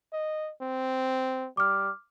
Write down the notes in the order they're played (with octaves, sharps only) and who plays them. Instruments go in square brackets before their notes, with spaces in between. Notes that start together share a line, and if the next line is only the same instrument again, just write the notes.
[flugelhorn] D#5
C4
[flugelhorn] G3 [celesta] D6 F6